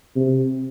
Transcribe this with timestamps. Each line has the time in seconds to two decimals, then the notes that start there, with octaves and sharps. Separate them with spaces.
0.16 C3